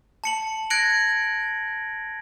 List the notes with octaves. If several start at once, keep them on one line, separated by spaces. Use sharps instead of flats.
A5 C#7 F#7
F#6 G#6 A#6 C#7 D7 F#7